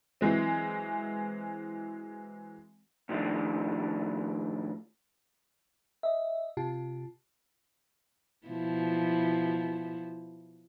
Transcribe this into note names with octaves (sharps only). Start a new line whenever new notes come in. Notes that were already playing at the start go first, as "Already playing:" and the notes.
E3 F#3 G#3 C4
A2 D#3 F3 D4
D#5 E5
C3 F4 G4 A5
B2 F3 E4